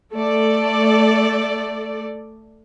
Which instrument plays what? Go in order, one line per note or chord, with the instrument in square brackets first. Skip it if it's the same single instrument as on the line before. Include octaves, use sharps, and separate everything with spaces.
[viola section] A3 A4 D5